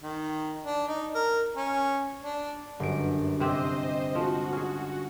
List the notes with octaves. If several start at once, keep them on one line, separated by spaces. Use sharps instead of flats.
D#3
D4
D#4
A#4
C#4
D4
G1 F#2 D7
C3 C4 G4 C5 D#5
F3 G#3 F#4
C#4 G#4